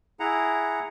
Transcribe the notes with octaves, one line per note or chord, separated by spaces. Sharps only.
E4 G#4 F#5 A#5